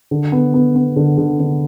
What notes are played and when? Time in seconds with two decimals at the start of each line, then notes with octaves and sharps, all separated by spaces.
0.11 D3
0.32 B3
0.54 B3
0.76 B3
0.96 D3
1.18 D3
1.40 D3